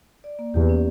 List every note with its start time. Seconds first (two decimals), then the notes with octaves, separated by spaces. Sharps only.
0.24 D5
0.39 A#3
0.54 E2 G4
0.69 C#4